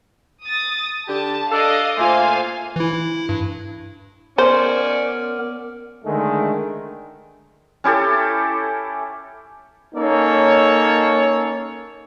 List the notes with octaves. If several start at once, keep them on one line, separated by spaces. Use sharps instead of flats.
D#6 A6
D3 G4 A5
D4 A4 D5 D#5 F5
A#2 A3 F4 C5 F5 G#5
E3 E4
E4
G2
B3 C#4 A#4 C5 D5
D3 D#3 G#3 A3
C#4 E4 G4 A4
A#3 C#4 D#4 A4 C#5